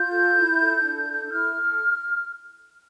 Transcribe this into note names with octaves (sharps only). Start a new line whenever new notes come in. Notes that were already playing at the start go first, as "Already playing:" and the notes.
Already playing: F4 G6
A4
E4
A4
D4
A4
E4 F6
A4